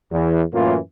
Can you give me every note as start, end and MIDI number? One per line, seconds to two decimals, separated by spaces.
0.11 0.41 40
0.53 0.75 42
0.53 0.75 45
0.53 0.75 52
0.53 0.75 58
0.53 0.75 65